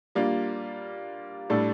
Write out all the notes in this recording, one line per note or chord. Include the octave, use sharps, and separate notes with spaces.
G3 A#3 D4 F4
A2 G3 D4 A4